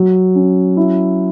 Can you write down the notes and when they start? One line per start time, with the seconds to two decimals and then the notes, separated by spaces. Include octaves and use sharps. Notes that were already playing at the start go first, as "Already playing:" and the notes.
Already playing: F#3
0.35 C#4
0.77 E4